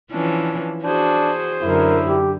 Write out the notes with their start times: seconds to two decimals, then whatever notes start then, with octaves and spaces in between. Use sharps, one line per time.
0.11 E3 F3 C#4 D4
0.84 D4 F#4 G#4 C5
1.63 F#2 D3 E4 A#4
2.05 G4